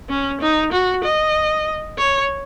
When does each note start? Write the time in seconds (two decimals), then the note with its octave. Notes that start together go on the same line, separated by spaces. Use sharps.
0.09 C#4
0.41 D#4
0.72 F#4
1.04 D#5
1.98 C#5